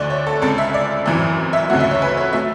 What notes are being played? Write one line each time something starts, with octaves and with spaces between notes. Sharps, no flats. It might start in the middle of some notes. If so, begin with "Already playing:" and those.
Already playing: D2 D3 A3 D5
C#5
A4
C#2 C#3 G#3 A4
E5
D5
G#1 F#2 E3
E5
D2 C#3 F#3 A3 F#5
E5
C#5
B4
C#5
F#3 A3 E5